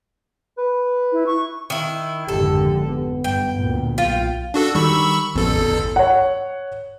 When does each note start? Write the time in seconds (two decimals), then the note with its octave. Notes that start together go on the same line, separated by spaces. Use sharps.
0.58 B4
1.12 E4
1.26 C#6
1.70 D#3 E4
2.29 G#1 F2 D3 G4 A4
2.84 B3
3.24 G2 G5
3.58 D2 A#2
3.98 B1 F4 G5
4.54 D4 F#4 A4
4.75 D#3 G3 B5 C#6 E6
5.35 A1 F2 B2 A4
5.50 G1 E2
5.96 C#5 F#5